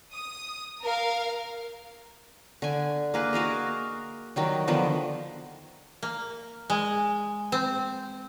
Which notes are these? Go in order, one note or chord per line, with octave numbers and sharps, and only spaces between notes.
D#6
A#4 F5
D3 G#5
A#3 G#4 B4
F#4 A#4 D#5 F5
D#3 F#3 G3
D3 D#3 F3 B3
A#3
G#3
C4